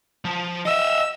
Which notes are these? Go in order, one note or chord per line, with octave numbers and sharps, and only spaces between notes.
F3
D#5 E5 E6